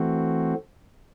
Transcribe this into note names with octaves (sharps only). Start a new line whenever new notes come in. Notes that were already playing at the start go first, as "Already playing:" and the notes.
Already playing: E3 A3 C4 F#4